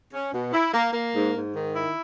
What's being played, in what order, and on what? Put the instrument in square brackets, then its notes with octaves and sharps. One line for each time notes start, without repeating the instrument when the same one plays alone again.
[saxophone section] C#4
B2
E4
A#3
A#3
G#2
G#2
D#3
E4